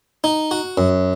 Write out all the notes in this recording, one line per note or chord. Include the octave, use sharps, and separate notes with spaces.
D#4
F#4
F#2